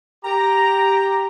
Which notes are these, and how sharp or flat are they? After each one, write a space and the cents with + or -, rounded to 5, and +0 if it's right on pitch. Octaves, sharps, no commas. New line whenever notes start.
G4 +0 A#5 +0